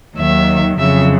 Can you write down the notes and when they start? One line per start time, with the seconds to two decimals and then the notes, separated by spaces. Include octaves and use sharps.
0.18 D#2 D#3 F#3 E5
0.78 F2 C#3 F#3 E5